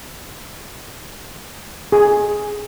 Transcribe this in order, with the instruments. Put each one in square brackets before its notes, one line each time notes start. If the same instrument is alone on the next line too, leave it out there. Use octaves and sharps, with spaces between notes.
[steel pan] G#4